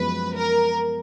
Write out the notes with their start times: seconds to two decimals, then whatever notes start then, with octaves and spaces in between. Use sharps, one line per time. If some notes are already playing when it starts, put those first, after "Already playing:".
Already playing: F#2 F3 G#3 B3 B4
0.36 A#4